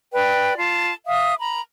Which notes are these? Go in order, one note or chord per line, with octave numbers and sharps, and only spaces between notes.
B4 D5 G5
F4 A5
E5 F5 D#6
A#5 B5